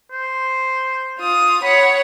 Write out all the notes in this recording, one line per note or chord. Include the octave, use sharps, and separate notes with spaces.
C5
F4 D#6
C#5 F#5 B5